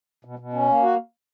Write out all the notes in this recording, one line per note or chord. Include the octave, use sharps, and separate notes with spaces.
B2
B2
C#4
A#3
F#4